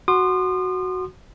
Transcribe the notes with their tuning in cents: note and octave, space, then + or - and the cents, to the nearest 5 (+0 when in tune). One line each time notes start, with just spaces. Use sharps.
F#4 +0 C6 +0 D#6 -40